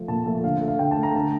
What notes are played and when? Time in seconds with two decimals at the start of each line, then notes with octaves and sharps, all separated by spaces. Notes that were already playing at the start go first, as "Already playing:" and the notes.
Already playing: F3 A3
0.08 A#2 A5
0.26 F3 A3
0.44 D3 F5
0.61 A3
0.68 F5
0.79 D3 G5
0.91 A5
0.97 A3
1.03 A#5
1.15 D3 A5